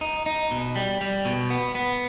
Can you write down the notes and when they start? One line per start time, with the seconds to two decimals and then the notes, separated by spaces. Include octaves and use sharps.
0.01 D#4
0.26 D#4
0.51 B2
0.76 G3
1.01 G3
1.25 B2
1.50 B3
1.75 B3